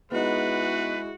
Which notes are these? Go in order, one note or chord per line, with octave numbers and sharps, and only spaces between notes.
G#3 B3 D#4 E4 F#4 B4